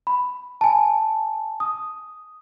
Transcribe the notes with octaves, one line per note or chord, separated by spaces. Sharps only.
B5
G#5 A5
D#6